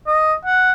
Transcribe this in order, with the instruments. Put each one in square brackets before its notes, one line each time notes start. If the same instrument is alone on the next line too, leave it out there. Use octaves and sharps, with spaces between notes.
[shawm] D#5
F#5